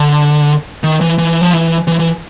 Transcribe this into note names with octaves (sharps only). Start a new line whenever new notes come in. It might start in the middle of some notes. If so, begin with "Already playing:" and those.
Already playing: D3
D#3
E3
E3
F3
E3
E3
E3